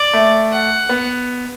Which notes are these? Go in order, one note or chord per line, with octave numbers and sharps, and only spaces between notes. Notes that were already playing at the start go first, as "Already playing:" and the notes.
Already playing: D5
A3
F#5
B3